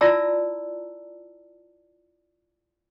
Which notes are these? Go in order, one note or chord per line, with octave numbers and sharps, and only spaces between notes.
E4 F4 D5 A5 A#5 E6